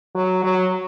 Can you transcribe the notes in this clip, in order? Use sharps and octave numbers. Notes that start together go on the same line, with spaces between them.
F#3
F#3